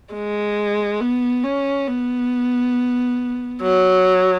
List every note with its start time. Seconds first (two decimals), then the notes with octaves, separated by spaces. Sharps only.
0.14 G#3
1.01 B3
1.44 C#4
1.88 B3
3.62 F#3